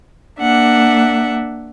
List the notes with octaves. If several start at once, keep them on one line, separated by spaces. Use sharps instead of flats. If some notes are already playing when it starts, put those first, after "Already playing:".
A#3 D4 E5 F#5